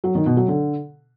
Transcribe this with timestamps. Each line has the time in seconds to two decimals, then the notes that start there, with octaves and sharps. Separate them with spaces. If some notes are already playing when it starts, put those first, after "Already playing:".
0.04 F#3
0.15 D#3
0.26 B2
0.37 F#3
0.48 D3